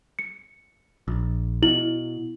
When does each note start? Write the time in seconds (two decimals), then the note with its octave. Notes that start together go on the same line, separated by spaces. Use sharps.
0.19 C#7
1.08 A#1
1.62 B2 E4 F#7